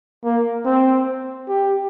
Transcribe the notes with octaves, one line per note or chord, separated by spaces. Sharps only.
A#3
C4
G4